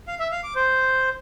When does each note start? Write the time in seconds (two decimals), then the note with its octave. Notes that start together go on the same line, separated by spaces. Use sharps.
0.08 F5
0.20 E5
0.31 F5
0.43 D6
0.55 C5